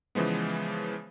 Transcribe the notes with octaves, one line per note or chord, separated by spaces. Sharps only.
C#3 E3 F3 G#3 B3